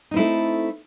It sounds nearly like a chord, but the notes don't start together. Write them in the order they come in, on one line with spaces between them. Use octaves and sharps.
D#4 C4 E4 A3